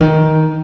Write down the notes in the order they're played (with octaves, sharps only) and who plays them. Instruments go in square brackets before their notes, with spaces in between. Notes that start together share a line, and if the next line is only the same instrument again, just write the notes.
[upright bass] D#3